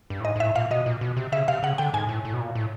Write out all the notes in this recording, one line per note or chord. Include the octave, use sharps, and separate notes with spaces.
G2
A2
G#2 D#5
G#2
A2 E5
A#2 F5
B2 D#5
A#2
B2
C3
C#3 E5
C3 F5
C#3 F#5
D3 G5
G#2 G#5
A2
A2
B2
A#2
A2